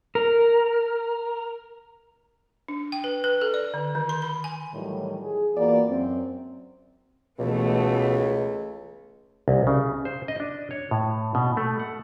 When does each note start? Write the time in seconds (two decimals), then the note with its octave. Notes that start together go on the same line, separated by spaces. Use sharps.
0.15 A#4
2.68 D4
2.92 G5
3.04 B4
3.24 B4
3.41 A4
3.54 D5
3.74 D3
3.95 D#3
4.09 C6
4.22 B5
4.44 G#5
4.73 A2 D#3 E3 F#3 G3
5.22 G#4
5.55 E2 E3 A#3 F4 F#4 D5
5.87 F#2 C4
7.39 C#2 B2 E3 A3
9.48 C2
9.67 C#3
10.05 C5
10.28 D#5
10.40 D4
10.71 C#5
10.91 A2
11.35 B2
11.57 A3
11.80 F#5